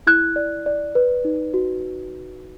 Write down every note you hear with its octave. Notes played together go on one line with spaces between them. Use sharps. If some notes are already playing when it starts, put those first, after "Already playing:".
E4 F#6 G#6
D5
D5
B4
D#4
F#4